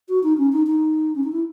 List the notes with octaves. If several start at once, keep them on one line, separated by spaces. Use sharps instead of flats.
F#4
D#4
C#4
D#4
D#4
C#4
D#4
E4